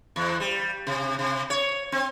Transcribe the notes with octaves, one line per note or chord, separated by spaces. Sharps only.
E2
G3
C3
C3
C#5
C4